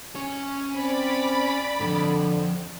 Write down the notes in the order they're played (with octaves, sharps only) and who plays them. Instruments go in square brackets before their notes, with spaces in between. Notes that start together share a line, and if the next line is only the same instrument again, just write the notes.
[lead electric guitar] C#4 C#5
[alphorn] C4 [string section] D5 B5
[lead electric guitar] F2 G#2 [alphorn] D3